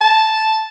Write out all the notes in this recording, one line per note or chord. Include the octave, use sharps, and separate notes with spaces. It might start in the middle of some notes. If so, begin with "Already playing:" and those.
A5